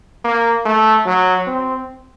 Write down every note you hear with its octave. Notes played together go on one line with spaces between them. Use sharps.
A#3
A3
F#3
C4